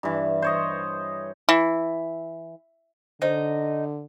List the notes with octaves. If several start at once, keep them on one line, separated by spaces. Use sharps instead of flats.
G2 E3
C5 C#5 D#5
E3
D3 D#4 C5